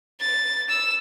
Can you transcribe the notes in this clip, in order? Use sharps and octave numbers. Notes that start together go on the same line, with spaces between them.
A6
E6